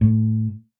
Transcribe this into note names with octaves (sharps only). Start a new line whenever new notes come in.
A2